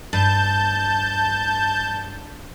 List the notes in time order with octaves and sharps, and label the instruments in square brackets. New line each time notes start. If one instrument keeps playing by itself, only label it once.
[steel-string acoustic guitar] G2 [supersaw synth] A5 G6